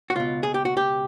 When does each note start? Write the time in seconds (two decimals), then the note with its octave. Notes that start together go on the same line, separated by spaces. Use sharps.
0.10 F#4
0.15 C#2 B2 F4
0.43 G#4
0.54 G4
0.65 F#4
0.77 G4